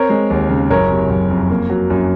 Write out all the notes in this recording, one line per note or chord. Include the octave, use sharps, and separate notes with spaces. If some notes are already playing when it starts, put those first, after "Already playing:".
Already playing: C4 A#4 C#5
G#3
D#2
C#3
F#1 A#4 C#5
C3
F#1
F2
A#3
F#3
F#2